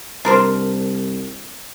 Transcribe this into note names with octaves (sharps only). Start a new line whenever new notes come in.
C2 D4 A#4 C5